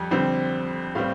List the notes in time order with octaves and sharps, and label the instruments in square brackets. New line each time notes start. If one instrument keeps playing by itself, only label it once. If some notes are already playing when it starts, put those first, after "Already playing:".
Already playing: [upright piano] F2 G3
F2 D3 G3 C4
A2 G3 C4 F5